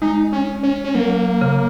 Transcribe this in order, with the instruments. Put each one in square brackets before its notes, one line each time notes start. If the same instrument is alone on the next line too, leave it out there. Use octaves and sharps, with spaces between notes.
[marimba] G#3 [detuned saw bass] D#4
[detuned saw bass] C#4
C#4
C#4
[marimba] F#3 [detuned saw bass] A#3
[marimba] C#3